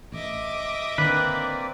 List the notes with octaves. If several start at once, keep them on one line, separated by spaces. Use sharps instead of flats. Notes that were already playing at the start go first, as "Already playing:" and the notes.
A1 D#5 E5 D6
D3 D#3 A#3 C4 B4 D5